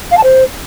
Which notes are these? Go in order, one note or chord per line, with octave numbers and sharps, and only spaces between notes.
F5
A5
C5